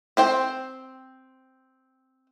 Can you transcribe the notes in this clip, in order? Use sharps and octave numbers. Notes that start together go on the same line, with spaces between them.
C4 C5 G5